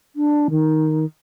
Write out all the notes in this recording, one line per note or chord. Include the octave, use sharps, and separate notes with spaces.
D4
D#3